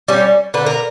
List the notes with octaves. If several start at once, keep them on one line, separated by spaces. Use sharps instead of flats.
G3 C#4
D3 B4
A#4